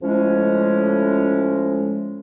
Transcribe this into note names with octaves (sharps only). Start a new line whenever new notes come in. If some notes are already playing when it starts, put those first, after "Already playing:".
A2 F3 G#3 C#4